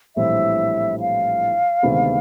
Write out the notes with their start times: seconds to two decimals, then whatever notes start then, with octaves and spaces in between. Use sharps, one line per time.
0.16 A#1 A2 E3 G3 C4 E5
1.00 F5
1.83 D2 C3 D#3 G#3 B3